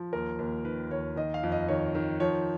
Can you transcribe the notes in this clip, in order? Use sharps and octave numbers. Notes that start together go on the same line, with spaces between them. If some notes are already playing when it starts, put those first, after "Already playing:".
Already playing: F3
D#2 A#4
D#2
D#3 B4
D#2 C#5
D#3 D#5
F5
F2
D#5
D#3 C#5
D#3
F3 C#5